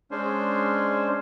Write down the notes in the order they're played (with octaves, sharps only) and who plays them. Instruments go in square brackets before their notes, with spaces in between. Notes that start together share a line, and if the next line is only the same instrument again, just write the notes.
[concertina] G#3 C#4 D4 C5